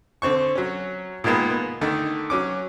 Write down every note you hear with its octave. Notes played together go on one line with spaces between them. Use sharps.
D3 C4 C5 C#6
F#3 C#4
A#2 D#3 G#3 A#3 B3
B3
D3 D#3 A3 D#4
F#3 C#4 D6